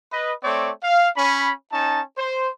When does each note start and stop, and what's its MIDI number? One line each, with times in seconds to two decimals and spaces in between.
0.11 0.32 71
0.11 0.32 75
0.44 0.71 57
0.44 0.71 60
0.44 0.71 73
0.44 0.71 74
0.83 1.09 77
1.16 1.52 61
1.16 1.52 83
1.72 2.01 61
1.72 2.01 63
1.72 2.01 81
2.17 2.49 72